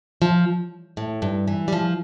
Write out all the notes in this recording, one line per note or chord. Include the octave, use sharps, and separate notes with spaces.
F3
A2
G2
E3
G3
F3